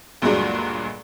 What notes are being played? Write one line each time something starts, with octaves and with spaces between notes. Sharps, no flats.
D2 G2 A#2 F#3 G#3 D4